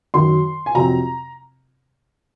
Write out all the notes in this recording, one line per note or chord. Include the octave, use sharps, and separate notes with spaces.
F#2 D#3 F#3 C6
G#5
F2 C3 F#3 C4 A#5